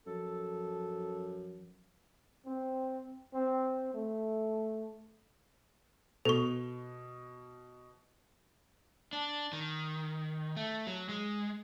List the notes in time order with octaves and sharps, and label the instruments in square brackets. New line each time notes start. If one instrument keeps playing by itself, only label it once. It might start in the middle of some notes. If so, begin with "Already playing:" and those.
[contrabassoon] F#2 [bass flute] F3 [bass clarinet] A4
[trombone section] C4
C4
A3
[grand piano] B2 [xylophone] A4 C#6
[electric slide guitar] D4
D#3
A3
F#3
G#3